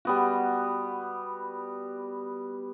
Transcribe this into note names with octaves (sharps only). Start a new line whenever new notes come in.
G3 B3 F#4